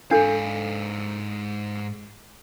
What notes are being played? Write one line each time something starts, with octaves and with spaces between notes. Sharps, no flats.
G#2 D4 A4 F5